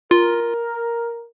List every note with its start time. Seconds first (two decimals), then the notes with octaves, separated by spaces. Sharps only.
0.11 F4 A#4